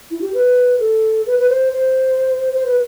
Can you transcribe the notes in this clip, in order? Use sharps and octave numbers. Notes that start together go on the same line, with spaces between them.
E4
G4
B4
A4
B4
B4
C5
C5
C5
B4